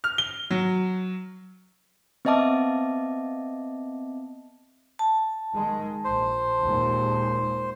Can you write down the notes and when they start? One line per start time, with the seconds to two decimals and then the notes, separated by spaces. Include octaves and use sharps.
0.04 F6
0.18 G7
0.51 F#3
2.25 B3 C4 D#5 E5 A5 D6
4.99 A5
5.52 D#3 G#3
6.04 A#1 C5
6.64 D#2 A#2 G#3